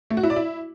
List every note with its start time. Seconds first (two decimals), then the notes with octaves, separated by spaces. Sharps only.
0.10 A3
0.17 F#4
0.23 E4
0.30 D5
0.36 E4